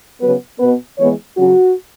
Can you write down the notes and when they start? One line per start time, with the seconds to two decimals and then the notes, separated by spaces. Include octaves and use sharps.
0.20 C#3 F#3 B3 B4
0.59 B2 B3 B4
0.98 E3 G#3 B3 C#5
1.37 C#3 F#3 C#4 F#4